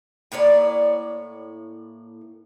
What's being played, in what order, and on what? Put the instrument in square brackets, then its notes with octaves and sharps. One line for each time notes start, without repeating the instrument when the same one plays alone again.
[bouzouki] A2 A#3 C#5 D5